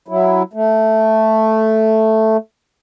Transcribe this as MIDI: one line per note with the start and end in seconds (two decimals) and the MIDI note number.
0.08 0.43 54
0.08 0.43 64
0.53 2.37 57